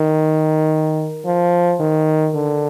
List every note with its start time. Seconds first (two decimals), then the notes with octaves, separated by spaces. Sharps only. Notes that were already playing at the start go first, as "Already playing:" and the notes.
Already playing: D#3
1.25 F3
1.79 D#3
2.34 D3